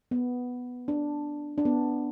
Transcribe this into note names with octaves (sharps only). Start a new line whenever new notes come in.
B3
D4
D4
B3